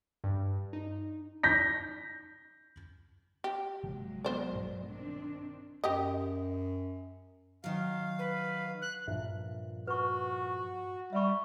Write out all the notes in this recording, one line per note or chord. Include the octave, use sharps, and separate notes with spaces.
G2
D#4
G6 A#6 B6
G4
G1 C3 F3 F#3 G#3 A#3
B3 C5 D5
A#1 G2 B2
D#3 C4 D4
F#2 G4 D#5
D#3 F#3 F5
B4
F#6
G2 A#2 F3 E5
F#4 B4 C#6
G3 E5 C#6